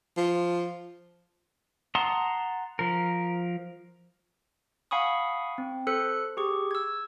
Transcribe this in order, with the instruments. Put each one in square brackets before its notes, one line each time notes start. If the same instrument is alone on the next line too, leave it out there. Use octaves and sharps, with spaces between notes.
[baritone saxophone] F3
[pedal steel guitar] F#5 A5 A#5 C6 D#6
F3 A#4
[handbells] F5 F#5 G#5 B5 C#6 D#6
C4
A4 C5 F#6 C#7
G4 G#4 C#6
E6 G#6